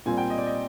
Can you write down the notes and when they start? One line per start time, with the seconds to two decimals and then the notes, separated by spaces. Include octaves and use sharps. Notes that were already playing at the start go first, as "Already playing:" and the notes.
0.06 A#2 G3 C4 F4 G#5
0.18 G5
0.30 D#5
0.38 D5
0.46 D#5